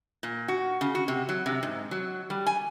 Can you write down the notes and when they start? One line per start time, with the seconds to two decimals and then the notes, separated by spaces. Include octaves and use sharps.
0.23 A#2
0.48 F#4
0.81 C#3
0.95 F#4
1.08 C3
1.29 F#3
1.46 C3
1.63 G#2
1.91 F#3
2.30 G3
2.47 G#5